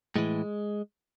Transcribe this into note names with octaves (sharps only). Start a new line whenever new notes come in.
A2 E3 G#3